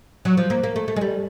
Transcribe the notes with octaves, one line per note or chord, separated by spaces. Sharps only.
F#3
F3
A#3
A#3
A3
A3
G#3
G3